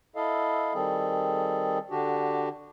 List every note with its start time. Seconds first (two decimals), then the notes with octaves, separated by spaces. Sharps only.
0.16 E4 A4 D#5 F5
0.74 D#3 G3 C4 G#4 A4
1.91 D3 D4 F#4 G4